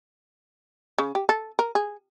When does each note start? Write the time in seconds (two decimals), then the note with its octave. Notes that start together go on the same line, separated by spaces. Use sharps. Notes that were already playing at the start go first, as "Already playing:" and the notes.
0.98 C#3
1.15 G4
1.29 A4
1.59 A#4
1.75 G#4